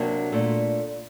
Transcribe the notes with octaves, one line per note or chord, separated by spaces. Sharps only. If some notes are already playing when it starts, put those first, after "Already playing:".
Already playing: C3 F#3 A#3 D4
A#2 A3